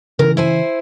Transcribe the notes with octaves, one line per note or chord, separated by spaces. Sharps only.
C#3 E3 A#4
E4 C5 G#5